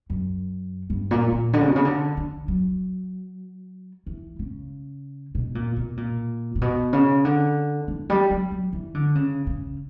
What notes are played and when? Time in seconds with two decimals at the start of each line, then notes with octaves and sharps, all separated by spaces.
0.10 F#2
0.90 G2
1.11 A#2
1.32 A#2
1.53 D3
1.61 C#3
1.67 B2
1.76 C#3
1.85 D3
2.17 D3
2.48 F#3
4.06 E3
4.39 C#3
5.35 B2
5.55 A#2
5.76 B2
5.97 A#2
6.55 A#2
6.62 B2
6.93 C#3
7.25 D3
7.88 E3
8.10 G3
8.31 F#3
8.52 F#3
8.73 E3
8.95 D3
9.15 C#3
9.47 C#3